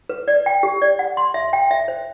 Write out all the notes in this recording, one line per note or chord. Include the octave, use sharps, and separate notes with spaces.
B4
D5
G5
G4
D5
F#5
C6
E5
G5
E5
C5